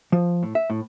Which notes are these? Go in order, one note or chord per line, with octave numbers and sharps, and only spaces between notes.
F3
A2
E5
A2